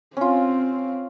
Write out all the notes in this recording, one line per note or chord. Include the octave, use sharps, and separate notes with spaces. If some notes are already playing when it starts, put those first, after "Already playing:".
C4 C#4 F4